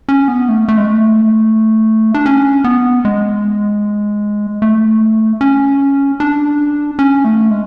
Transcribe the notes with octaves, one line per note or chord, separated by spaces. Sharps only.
C#4
B3
A3
A3
G#3
A3
D4
C#4
B3
G#3
A3
C#4
D4
C#4
A3
G#3